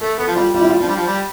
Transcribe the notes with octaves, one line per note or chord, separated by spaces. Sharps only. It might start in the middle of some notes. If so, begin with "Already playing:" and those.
A3 A4
B3 A4
F3
G3 F4
G3 F4
E4
F4
F3 D4
G3
F3
G3